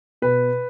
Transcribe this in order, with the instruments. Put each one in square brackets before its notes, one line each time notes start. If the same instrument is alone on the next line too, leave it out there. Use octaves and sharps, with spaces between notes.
[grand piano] B2 B4